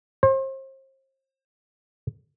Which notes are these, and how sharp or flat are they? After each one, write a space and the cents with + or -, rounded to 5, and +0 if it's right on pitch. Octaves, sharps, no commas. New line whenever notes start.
C5 +35